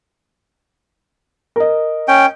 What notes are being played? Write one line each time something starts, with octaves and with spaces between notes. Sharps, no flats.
A#4 D#5
C#4 G5